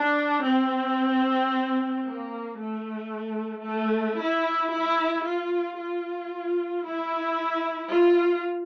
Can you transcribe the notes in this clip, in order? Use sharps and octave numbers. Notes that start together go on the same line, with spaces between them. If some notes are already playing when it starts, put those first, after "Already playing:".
Already playing: D4
C4
A#3
A3
A3
E4
E4
F4
F4
E4
F4